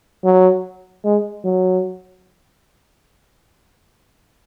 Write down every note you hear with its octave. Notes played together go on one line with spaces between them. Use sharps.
F#3
G#3
F#3